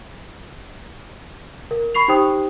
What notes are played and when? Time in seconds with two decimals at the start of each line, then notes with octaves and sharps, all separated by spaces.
1.71 A#4
1.94 B5 C#6 C7 F7
2.08 D#4 G4 C5 G5 D#6